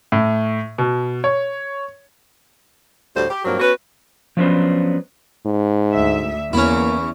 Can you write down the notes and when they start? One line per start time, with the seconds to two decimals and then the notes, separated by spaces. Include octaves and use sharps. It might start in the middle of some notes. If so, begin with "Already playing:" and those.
0.12 A2
0.78 B2
1.24 C#5
3.16 D2 A2 G3 C5
3.30 G4
3.45 G2 A#2 F#3 A#3 C4
3.60 B3 C#4 F#4 B4
4.37 F3 F#3 B3 C#4 D4 C5
5.46 G#2
5.95 D2 E5
6.53 E2 A#3 C#4 E4